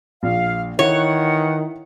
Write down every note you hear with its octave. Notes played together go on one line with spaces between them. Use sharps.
A#1 F5
D#3 E3 E4 C#5 F#5